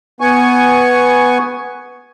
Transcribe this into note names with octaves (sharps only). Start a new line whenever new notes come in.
B3 G#5 C#6